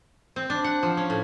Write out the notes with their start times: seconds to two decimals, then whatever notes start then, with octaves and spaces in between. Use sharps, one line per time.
0.36 C4
0.50 D4
0.64 F#5
0.83 F3
0.97 C#4
1.10 A2